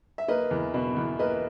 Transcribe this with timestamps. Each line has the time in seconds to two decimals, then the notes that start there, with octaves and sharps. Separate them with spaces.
0.18 E5
0.28 A#3 B4 D#5
0.51 E2
0.74 B2
0.97 E2
1.19 A#3 B4 D#5